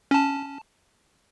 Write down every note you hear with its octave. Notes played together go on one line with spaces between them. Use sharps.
C#4 A5